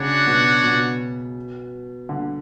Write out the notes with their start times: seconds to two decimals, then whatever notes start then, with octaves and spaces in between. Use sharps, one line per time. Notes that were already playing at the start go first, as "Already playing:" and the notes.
Already playing: C#3 D4 F#4 C#5 F#5
0.27 B2
0.64 B2
2.09 D3